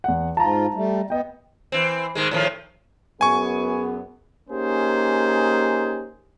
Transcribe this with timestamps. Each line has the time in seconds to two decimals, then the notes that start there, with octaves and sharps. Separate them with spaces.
0.04 E2 F#5
0.37 G#2 F4 A5 A#5
0.74 G3 A3
1.10 B3 D#5 G5
1.72 E3 C4
2.15 G#2 D#3 G#3
2.31 A2 D#3 F3
3.21 F#2 B3 G#4 G#5 C#6
4.49 A#3 C#4 D#4 G4 G#4 C5